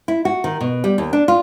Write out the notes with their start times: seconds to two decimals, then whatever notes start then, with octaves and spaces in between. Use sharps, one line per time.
0.08 E4
0.25 F#4
0.44 D#3
0.61 B2
0.84 G3
0.98 D#2
1.13 D4
1.28 F4